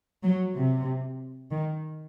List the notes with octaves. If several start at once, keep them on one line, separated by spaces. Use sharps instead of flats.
F#3
C3
D#3